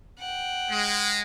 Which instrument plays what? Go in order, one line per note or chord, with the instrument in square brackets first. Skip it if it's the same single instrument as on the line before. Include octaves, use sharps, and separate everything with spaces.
[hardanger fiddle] F#5 G5
[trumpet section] G#3